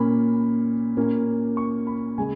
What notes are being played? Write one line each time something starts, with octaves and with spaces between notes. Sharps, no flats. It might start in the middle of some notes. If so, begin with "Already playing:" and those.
Already playing: A#2 A#3 C#4 B5
A#2 A#3 C#4
C#6
B5
C#3 G#3 G#5